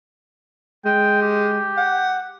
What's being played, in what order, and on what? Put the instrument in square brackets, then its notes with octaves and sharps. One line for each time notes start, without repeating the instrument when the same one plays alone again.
[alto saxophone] G#3 [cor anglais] G5
[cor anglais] G4
[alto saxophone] F#5